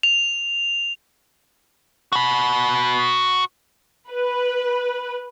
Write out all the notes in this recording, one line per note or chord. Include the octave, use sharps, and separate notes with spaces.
F7
F#4 B5
B4